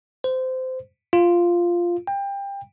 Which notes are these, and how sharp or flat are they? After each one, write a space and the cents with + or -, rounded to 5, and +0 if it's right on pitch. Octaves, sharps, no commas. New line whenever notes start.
C5 -20
F4 -5
G5 +25